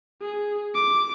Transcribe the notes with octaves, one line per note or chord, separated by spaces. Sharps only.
G#4
D6